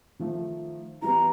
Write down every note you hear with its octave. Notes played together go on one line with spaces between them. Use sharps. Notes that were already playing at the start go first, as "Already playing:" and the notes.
D#3 F3 A3
E3 G3 B3 A#5